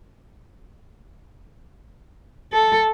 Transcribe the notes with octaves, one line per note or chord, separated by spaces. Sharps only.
A4